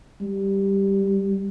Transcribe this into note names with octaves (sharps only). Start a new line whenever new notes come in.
G3